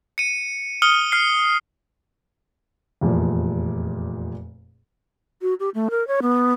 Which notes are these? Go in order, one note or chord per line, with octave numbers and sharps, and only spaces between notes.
C#7 D#7
D#6 F6 C#7 G7
F6 C7
F1 E2 A#2 F3 E4
F#4
G4
A3
A#4
C#5
B3